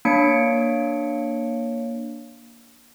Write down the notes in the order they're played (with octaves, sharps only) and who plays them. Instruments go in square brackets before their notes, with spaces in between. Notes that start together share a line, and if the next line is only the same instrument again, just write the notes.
[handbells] A#3 D4 C#5 C#7 D7